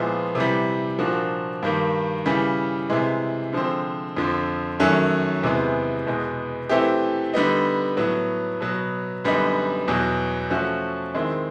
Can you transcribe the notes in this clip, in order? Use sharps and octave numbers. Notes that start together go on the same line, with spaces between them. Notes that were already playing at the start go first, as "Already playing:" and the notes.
Already playing: A#2 F3 G#3 B3 E4
C3 E3 G3
A#2 F3 A#3 D4 F#4
G2 D#3 G3 A#3
C#3 E3 G3
C3 E3 G#3
D3 F3 G#3 C4
F2 D3 F3
F#2 D#3 F#3 A3 C#4
E2 C3 E3 G#3 B3
E2 B2 G#3 B3
E3 A3 C4 E4 G4
D3 G3 B3 D#4
A2 F#3 B3
B2 F#3 B3
F#2 D3 G3 B3 D#4
E2 B2 F#3
F3 A3 C#4 F#4
D#3 G#3 C4 E4